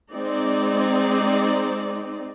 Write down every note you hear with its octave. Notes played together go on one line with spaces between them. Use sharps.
G#3 C4 D#4 D5